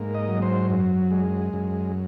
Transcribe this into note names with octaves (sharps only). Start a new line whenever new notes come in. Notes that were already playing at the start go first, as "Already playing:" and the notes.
Already playing: G#2 A#3
D#5
F#3
C5
F#2
G#3
F#2